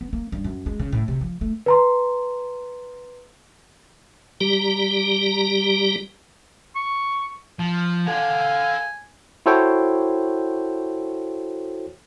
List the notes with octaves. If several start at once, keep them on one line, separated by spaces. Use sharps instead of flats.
B3
A#3
G2
F#2
G#3
C#3
A2
C3
F3
A3
B4 A#5 C6
G3 G4 A#5
C#6
F3
A4 F5 F#5 G#5
E4 F#4 A4 C5 C#5 G5